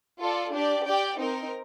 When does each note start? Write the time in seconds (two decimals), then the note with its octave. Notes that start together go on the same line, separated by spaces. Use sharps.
0.19 F4 A4 D5
0.52 D4 G4 D5
0.85 G4 D5 G5
1.18 C4 D#4 A#4